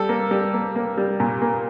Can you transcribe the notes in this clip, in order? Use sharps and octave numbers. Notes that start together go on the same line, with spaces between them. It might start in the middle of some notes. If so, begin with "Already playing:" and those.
Already playing: G3 A4
A#3
G3
A#3
A#3
G3
A#2
A#3